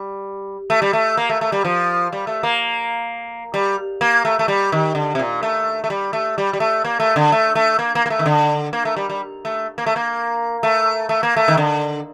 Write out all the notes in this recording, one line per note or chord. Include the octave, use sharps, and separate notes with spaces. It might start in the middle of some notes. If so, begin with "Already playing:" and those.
Already playing: G3
A3
G3
A3
A#3
A3
A3
G3
F3
G3
A3
A#3
G3
A#3
A3
A3
G3
D#3
D3
C3
A#2
A3
A3
G3
A3
G3
G3
A3
A#3
A3
D3
A3
A3
A#3
A#3
A#3
A3
D#3
D3
A#3
A3
G3
G3
A3
A#3
A3
A#3
A3
A3
A#3
A3
D#3
D3